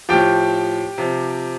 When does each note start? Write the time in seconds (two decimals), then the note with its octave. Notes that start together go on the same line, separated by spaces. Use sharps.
0.09 A2 F3 G4 G5
0.98 C3 F3